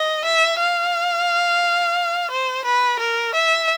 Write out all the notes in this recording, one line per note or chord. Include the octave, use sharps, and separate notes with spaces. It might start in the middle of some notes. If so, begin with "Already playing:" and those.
Already playing: D#5
E5
F5
C5
B4
A#4
E5